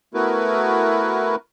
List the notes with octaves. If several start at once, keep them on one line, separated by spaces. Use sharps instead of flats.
A3 B3 E4 F#4 A#4 B4